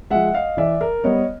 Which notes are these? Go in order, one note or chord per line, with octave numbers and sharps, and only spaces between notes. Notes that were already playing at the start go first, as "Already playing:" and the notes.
F3 G#3 E5 F#5
D#5 F5
E3 D5 E5
A#4
G3 B3 C#5 D#5